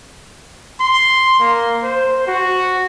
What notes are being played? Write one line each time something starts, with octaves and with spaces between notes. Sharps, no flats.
C6
A#3
C5
F#4